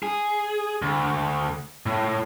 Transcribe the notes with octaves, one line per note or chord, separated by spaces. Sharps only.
G#4
D2
A2